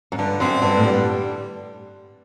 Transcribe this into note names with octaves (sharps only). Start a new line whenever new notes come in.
F#2
G2 D3
F#2 C4
G2 D3
A2
G2 G3